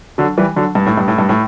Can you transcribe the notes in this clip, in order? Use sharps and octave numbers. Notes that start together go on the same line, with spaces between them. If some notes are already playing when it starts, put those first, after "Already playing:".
D3 F#3
E3 G3
D3 F#3
G2
A2
G2
A2
G2
A2